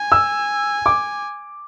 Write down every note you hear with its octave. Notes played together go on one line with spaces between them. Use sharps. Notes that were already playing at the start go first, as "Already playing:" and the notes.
Already playing: G#5
E6
D6